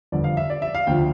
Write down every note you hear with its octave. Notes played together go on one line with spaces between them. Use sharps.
G1 F2 D3 D5
F5
E5
D5
E5
F5
D2 D3 F3 G5